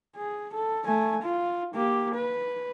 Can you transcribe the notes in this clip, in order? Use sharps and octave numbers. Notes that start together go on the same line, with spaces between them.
G#4
A4
A3 G#5
F4
A#3 G4
B4